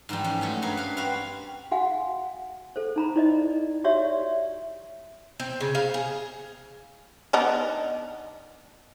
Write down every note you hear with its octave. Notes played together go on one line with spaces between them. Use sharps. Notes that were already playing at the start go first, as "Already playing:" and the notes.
G#2 E3 F3 G3
C#4
F#3 G#3 A3
G2 A#4 B4 F5
B4 F5
C4 F#4 B4 F5
F#4 F5 F#5 G#5
A4 C5
D#4 A#5 B5
E4 D5 D#5
F#4 G4 C#5 D5 E5
C4
C#3
F5
G#4
B3 D4 D#4